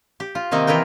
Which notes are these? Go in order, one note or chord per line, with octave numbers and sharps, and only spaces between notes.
G4
F4
C3 D#3 A#3 C4 D#4
E3 E4 F4 A#4 G5